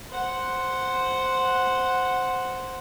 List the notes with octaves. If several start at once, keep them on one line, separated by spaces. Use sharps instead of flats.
C5 F#5